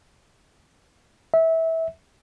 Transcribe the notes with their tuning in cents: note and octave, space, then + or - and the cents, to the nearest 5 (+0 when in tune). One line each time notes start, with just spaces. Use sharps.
E5 -20